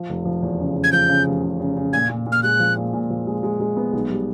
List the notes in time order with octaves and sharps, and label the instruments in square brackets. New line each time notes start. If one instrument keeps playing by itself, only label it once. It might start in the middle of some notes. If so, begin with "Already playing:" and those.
Already playing: [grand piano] F3
F1
F3
E2
C#3
C#3
[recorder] G#6
[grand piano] F3 [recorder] G6
[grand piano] C#3
F1
C#3
C#3
C#3
[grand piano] A#2 [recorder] G#6
[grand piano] A#2
A#2
[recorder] F6
[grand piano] G#3 [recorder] F#6
[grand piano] F3
A#2
A#2
F3
G#3
G#3
G#3
B3
B1
G3